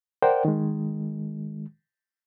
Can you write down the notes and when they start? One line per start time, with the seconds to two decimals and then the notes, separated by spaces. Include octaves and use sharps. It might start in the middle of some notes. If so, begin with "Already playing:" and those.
0.22 A#4 C5 D5 F#5 G5
0.45 D#3 G#3